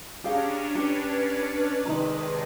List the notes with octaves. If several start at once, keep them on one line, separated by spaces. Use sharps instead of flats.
C#4 D4 G4 G#4 C#5 F5 A#5 D6
G4 B4 D5 A5
C3 D#3 G#3 D#4 A#4 A#5